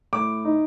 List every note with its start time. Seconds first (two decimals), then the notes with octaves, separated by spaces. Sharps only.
0.13 A2 D6
0.45 D#4